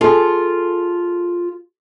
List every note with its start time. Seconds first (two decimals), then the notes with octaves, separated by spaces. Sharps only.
0.01 F4 G#4 A4